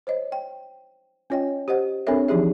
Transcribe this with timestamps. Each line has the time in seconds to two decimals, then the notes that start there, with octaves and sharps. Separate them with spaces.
0.07 C5 C#5 D#5
0.32 G5
1.30 C#4 F4 C#5 D#5 G5
1.68 G4 C5 D#5 F#5
2.07 C4 D4 A4 A#4 C#5 E5
2.28 E3 F3 D#4 G4 G#4 E5